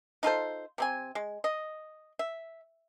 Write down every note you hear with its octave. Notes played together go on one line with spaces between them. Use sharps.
D#4 F4 A4 C5
C3 C4 G#5
G#3
D#5
E5